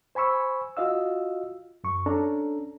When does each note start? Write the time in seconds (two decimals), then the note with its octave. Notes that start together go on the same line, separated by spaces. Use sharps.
0.15 C5 G#5 B5 C#6 E6
0.77 F4 F#4 D#5 F5 E6
1.84 F#2 C#6
2.06 C#4 D4 A4 A#5